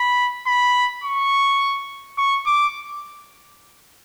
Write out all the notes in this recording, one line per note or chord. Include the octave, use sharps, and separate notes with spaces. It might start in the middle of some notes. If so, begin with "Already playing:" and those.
Already playing: B5
B5
C#6
C#6
D6